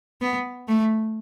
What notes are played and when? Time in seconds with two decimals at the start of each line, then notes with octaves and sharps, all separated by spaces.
0.21 B3
0.68 A3